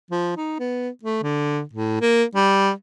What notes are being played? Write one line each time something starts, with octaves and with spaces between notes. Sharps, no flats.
F3
D#4
B3
A3
D3
A2
A#3
G3